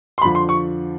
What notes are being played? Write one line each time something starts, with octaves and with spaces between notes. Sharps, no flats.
C6
F2 D3 F3 B5
C6
C#6